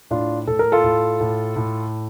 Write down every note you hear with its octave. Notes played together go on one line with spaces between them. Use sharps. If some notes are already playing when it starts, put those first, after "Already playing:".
A2 D4 F4
A2 A4
A#4
F4 A4
A2
A2
A2